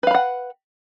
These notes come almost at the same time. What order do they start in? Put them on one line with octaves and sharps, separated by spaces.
B4 F5 B5 F#5